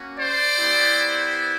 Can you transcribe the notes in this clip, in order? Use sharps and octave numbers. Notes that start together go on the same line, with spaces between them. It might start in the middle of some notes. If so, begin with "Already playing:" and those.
Already playing: A#3 C#4 F#4
C5 D5
B3 E4 G4